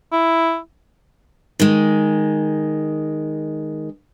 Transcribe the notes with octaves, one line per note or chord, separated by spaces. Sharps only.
E4
D#3 G#3